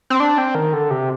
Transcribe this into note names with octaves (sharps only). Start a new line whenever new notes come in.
C4
D4
C4
D#3
D3
C3